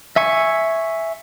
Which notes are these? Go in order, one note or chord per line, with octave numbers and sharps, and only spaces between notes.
E5 G#5 C#6